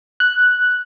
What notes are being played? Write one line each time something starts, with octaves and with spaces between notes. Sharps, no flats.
F#6